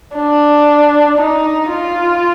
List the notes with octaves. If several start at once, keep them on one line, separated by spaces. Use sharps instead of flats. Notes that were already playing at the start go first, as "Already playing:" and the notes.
D4
D#4
F4